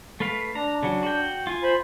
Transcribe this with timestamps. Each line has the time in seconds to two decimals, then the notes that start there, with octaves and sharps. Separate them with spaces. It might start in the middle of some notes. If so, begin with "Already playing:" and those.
0.20 A3 B4 F5
0.55 D4 A#5
0.83 C#3 F#3
1.03 F#4 G5
1.47 F4 G#5
1.63 C5 B5